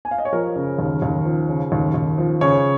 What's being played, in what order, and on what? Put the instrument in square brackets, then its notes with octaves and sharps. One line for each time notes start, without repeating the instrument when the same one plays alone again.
[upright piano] G#5
F5
D#5
C#5
F3 A#4
C#3
D#2
D#2
F3
C#3
D#2
D#2
F3
C#3 C#5